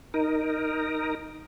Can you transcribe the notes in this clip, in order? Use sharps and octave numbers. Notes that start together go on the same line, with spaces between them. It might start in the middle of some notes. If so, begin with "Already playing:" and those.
D#4 A#4